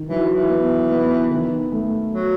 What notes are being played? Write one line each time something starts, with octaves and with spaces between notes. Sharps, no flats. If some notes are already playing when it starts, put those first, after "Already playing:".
Already playing: D#3
E3 F#3
E3
B3
B3
D#3
A3
F#3